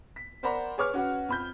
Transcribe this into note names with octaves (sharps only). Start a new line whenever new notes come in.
B6
A#4 C5 D5 F#5 A#5 B5
G#4 B4 C#5 C#6 D6 F6
C#4 F#4 B4 F#5
F2 B5 G6